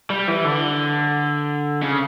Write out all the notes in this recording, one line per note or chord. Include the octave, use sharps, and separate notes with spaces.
G3
E3
D3
C#3